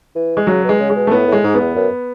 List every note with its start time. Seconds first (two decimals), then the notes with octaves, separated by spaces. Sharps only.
0.15 E3
0.37 G#3
0.47 C#3 F#3
0.64 B2
0.69 G#3
0.80 C#3
0.90 G#3
0.95 B2
1.07 A3
1.11 A2 B3
1.27 A2
1.32 G#3
1.44 G#2
1.55 E2 B3
1.76 F#2